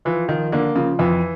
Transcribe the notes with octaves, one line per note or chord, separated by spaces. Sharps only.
E3 F3
D#3 F3
D3 A#3
C#3 F3
F2 E3